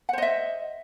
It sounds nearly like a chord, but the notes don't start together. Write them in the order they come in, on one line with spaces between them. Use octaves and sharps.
F#5 C5 D#5 E5